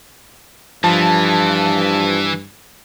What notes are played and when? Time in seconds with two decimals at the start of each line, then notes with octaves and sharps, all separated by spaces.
0.84 G2 E3 F3 A5